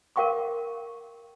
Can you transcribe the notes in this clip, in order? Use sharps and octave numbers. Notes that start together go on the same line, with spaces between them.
A#4 F5 G5 C#6 D6